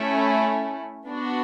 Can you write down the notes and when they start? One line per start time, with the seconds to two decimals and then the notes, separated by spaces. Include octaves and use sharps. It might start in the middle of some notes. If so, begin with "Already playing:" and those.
Already playing: A3 C#4 E4
1.08 B3 D4 F#4